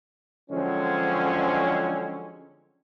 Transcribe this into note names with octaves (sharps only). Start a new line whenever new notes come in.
D3 F3 F#3 G#3 C4 C#4